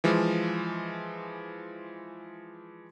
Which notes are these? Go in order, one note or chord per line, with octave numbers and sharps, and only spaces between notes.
E3 F3 G#3